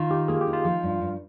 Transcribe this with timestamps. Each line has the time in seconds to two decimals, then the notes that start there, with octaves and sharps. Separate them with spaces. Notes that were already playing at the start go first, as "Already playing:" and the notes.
Already playing: D#3 F4
0.10 D#4 G4
0.28 A#3 G#4
0.41 G4
0.47 D#4
0.53 F4
0.65 F3
0.83 G2
1.01 G2